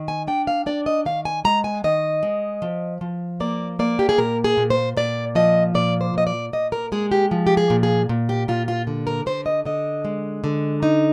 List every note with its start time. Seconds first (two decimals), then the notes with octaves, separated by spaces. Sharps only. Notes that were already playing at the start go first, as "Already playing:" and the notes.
Already playing: D#3
0.08 G#5
0.27 D4 G5
0.47 F5
0.66 D4 D5
0.86 D#5
1.05 D#3 F5
1.25 G#5
1.45 G#3 A#5
1.64 G#5
1.84 D#3 D#5
2.23 G#3
2.62 F3
3.01 F3
3.40 A#3 D5
3.79 A#3 D5
3.99 G4
4.09 G#4
4.18 A#2 A#4
4.44 G#4
4.57 A#2
4.70 C5
4.97 A#2 D5
5.35 F3 D#5
5.75 A#2 D5
6.01 C5
6.14 A#2 D#5
6.27 D5
6.53 A#2 D#5
6.72 A#4
6.92 G#3 G#4
7.12 G4
7.31 F3
7.47 G4
7.57 G#4
7.70 A#2
7.83 G#4
8.09 A#2
8.29 G4
8.48 A#2 F4
8.68 F4
8.87 D3
9.07 A#4
9.26 D3 C5
9.46 D#5
9.66 D3 D#5
10.05 G#3
10.44 D3
10.83 D#4